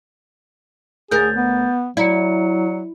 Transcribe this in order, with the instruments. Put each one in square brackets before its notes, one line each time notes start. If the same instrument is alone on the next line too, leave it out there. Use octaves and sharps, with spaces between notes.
[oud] D2 A#4 [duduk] G#4 [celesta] G6 A6
[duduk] B3
[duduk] F#3 [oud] E4 [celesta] D5 A#5 C#7